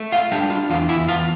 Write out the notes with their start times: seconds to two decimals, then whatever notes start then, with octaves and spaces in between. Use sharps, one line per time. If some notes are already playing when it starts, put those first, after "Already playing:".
Already playing: A3
0.12 F4 F5
0.32 G3 D4 G4
0.50 F4
0.70 E2 F4
0.89 E4 E5
1.08 E2 F4 F5